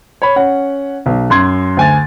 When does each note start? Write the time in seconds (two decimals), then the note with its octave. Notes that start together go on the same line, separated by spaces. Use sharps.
0.22 C#5 B5
0.36 C#4 F#5
1.06 B1
1.30 F#2 C6 G#6
1.77 D2 G#5 A6